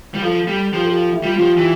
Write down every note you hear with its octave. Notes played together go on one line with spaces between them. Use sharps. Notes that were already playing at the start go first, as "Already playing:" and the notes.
G3
F3 A4
G3 G4
F3 G4
A4
G4
E4
G3 F4
F4
F3 G4
E3 G4